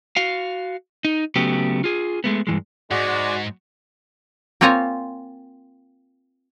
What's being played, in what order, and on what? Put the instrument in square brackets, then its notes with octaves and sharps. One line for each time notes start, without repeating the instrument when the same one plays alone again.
[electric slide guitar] F#4 F5
D#4
C#3 F#3 A3 B3 G4
F4 G#4
G#3 A3 B3
G2 E3 G#3
[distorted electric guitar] G#2 [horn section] G#3 [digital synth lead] F#4 [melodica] D5
[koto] A#3 C4 F4 C#5 G#5 A#5